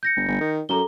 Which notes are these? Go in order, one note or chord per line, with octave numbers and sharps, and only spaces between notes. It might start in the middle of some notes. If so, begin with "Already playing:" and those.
G6 A#6 C#7
G1
G1
D#3
F#2 A4 A#5 G7